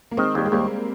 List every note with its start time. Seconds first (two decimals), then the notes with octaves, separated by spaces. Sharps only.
0.11 A#3
0.17 D#3 G#3 C4
0.35 D#2 G3
0.46 G#3
0.52 D#2 G3 A#3